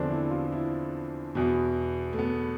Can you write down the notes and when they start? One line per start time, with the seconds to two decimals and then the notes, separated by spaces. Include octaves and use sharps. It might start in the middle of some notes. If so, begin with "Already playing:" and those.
Already playing: E2 D3 F3 C4 D4
0.10 E4
0.31 F4
0.52 E4
1.35 E2 B2
2.13 A3
2.19 B3